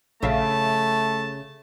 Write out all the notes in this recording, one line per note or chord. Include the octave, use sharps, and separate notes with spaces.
A#1 C#3 A3 E5 F5 A5